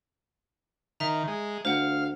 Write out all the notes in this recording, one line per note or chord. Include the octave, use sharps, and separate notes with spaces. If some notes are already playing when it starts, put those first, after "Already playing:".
D#3 E5 A#5
G#3
D2 C5 F5 F#5